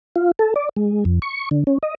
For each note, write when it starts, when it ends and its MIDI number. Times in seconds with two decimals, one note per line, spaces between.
0.16 0.31 65
0.39 0.54 69
0.56 0.69 74
0.77 1.04 56
1.05 1.19 41
1.22 1.49 85
1.51 1.64 50
1.67 1.78 61
1.83 1.95 75